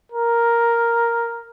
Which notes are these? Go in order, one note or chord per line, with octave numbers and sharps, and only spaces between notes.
A#4